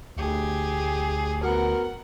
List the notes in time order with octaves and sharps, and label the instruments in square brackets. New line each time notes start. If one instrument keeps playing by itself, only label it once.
[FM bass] D2 [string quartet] G4 G#4
[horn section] B3 F#4 A#4 [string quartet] F#5